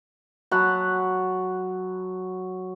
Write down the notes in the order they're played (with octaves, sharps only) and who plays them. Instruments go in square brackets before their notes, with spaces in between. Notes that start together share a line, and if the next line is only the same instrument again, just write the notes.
[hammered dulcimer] F#3 F#5 A5 B5